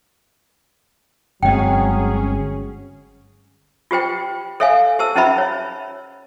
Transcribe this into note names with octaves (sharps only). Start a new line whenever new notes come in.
G1 F#3 G#3 C4 C#4 G#4 D#5 G5
F4 G4 C5 G5
A4 C#5 E5 F5 G#5
G4 C5 A5 E6
C#4 D#4 E4 C5 E5 B5
C#5